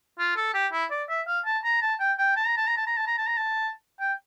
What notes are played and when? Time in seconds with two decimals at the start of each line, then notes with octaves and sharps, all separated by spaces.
0.19 F4
0.36 A4
0.54 G4
0.72 E4
0.91 D5
1.09 E5
1.27 F5
1.46 A5
1.64 A#5
1.82 A5
2.00 G5
2.18 G5
2.36 A5
2.47 A#5
2.57 A5
2.67 A#5
2.77 A5
2.87 A#5
2.97 A5
3.07 A#5
3.18 A5
3.27 A#5
3.37 A5
4.00 G5